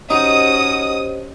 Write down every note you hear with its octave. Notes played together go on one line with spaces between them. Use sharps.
C#4 D#4 F#4 G4 C5 D#5 D#6